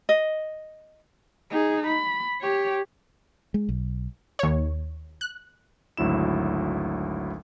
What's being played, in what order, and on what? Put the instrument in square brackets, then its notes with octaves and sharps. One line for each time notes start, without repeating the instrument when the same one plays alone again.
[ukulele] D#5
[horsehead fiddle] D#4 G#4
B5
G4 C#5
[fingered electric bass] G#3
B1
[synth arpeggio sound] D#2 C#5
F#6
[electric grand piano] G#1 D2 F#3 E4 E7